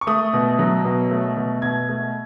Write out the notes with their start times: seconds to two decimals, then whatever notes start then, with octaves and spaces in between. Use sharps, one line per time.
0.01 C#6
0.07 A3 D#6
0.33 B2
0.59 F#3
0.85 B2
1.11 A3
1.37 B2
1.62 B2 G#6
1.89 A3